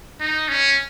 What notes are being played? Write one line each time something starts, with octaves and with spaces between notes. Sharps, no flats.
D#4
C#4